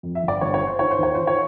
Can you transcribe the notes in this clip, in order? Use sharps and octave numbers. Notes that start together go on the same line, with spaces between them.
F2
E5
G1
D5
G1 C#5
C#5
D3
C5
D#3 C#5
C5
D#2 C#5
D#3 C5
C#5